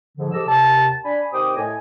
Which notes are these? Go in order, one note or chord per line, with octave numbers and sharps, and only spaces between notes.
G#2 D3 F3
G4 A4 C5 D#5 D6 E6
D#2 C3 A5
D4 G#5 B5
C3 D#3 C5 G5 D6 D#6
A2 D#5 G#5